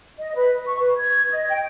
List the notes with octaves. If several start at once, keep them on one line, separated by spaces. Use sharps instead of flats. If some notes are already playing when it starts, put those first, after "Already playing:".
D#5
B4
C#6
B4
G#6
D#5
G5